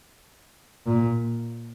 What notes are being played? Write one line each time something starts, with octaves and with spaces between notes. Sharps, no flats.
A#2